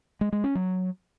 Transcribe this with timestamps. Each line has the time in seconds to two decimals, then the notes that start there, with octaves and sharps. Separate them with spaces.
0.21 G#3
0.32 G#3
0.44 C#4
0.55 F#3